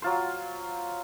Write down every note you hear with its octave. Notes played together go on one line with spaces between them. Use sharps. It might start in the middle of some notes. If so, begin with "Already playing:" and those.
F#3 F4 C5